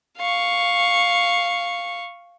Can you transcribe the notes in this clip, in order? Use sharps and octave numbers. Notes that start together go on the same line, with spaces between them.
F5 C#6